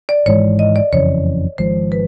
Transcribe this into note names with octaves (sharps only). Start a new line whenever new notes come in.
D5
G#1 G#2 E3 G#3 C#5
D#5
D5
F#1 F2 C#3 E3 C#5
G#1 G#2 F3 C5
B4